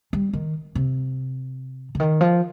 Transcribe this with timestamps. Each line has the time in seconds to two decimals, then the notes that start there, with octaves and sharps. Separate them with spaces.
0.13 G3
0.33 D#3
0.75 C3
1.95 D3
2.00 D#3
2.21 F3